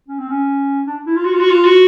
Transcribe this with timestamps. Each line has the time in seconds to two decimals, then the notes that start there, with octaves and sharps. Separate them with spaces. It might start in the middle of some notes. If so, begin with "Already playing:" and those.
0.08 C#4
0.19 C4
0.30 C#4
0.87 D4
1.06 E4
1.16 F4
1.25 F#4
1.33 F4
1.40 F#4
1.50 F4
1.65 F#4